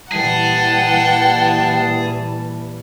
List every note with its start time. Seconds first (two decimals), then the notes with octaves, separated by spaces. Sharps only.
0.12 A#2 E3 G3 G#4 F#5 G5 A5